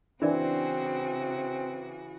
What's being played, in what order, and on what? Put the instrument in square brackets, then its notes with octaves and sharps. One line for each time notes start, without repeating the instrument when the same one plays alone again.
[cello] C#3 F#4 [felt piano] E3 [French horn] C4 [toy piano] D4 A#4 D5